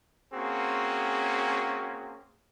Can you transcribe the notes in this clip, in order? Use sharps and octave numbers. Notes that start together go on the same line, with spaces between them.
A#3 C4 C#4 F#4 G#4